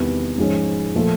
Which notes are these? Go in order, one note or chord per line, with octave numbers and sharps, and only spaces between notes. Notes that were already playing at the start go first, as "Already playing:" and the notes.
Already playing: E2 C3 D#3 G3 B3
G#2 F3 G#3 C#4
A#2 F3 A3